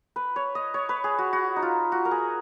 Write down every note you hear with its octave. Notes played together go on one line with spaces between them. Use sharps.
B4
C#5
D#5
C#5
B4
G#4
F#4
F#4
D#4
F4
F#4
A#4
G#4